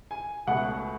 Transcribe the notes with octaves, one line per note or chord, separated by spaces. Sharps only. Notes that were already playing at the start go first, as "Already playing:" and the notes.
G#5
C#2 B2 A3 F#5